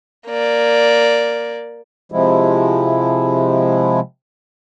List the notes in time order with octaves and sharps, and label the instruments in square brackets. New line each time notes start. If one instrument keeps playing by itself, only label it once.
[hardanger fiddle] A#3 D5
[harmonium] C3 F3 G#3 E4